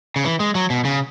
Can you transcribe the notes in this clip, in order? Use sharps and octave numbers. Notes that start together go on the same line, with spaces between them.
C#3
E3
G#3
F#3
B2
C#3